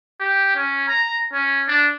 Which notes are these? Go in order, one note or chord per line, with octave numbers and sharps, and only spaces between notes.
G4
C#4
A#5
C#4
D4